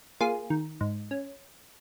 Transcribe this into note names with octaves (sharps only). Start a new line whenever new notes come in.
A#3 F4 G#4
D#3
G#2
C#4